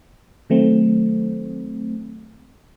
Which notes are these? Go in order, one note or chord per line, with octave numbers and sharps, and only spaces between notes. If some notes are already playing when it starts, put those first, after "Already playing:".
D#3 F#3 A3 C4